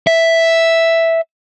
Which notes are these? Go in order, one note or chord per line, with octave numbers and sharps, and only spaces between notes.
E5